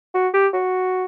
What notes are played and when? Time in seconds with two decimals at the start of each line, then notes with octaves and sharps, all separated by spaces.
0.14 F#4
0.34 G4
0.53 F#4